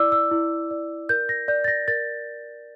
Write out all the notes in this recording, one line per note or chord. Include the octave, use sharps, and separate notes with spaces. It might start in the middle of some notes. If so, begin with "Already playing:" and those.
Already playing: E4 D5 D6 E6
E6
E4
D5
A#4 G6
A#6
D5 G6
A6
A#6
A#4 A6